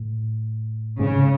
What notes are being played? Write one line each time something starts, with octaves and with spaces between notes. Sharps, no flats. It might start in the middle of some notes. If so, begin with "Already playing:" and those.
Already playing: A2
G#2 C#3